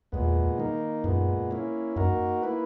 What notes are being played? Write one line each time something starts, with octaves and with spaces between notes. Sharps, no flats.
E2 A#2 G#3 B3
D#3 A#3 D#4
F#2 A#2 G#3 B3
A#3 C#4 E4
F#2 A#3 D#4 F#4 A#4
A#3 E4 B4